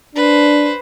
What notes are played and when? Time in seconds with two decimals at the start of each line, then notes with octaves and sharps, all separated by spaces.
0.16 D4 B4 C5